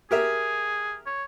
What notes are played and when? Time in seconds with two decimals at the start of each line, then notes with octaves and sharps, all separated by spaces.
0.11 G4 G#4 A#4 E5
1.06 C#5